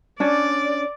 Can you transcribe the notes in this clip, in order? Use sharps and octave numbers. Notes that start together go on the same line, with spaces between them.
C#4 D4 D5